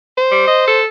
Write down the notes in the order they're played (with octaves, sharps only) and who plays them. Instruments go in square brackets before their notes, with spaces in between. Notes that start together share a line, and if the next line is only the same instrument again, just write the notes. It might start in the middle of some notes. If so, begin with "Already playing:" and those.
[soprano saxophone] C5
[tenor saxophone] G3
D#5
A4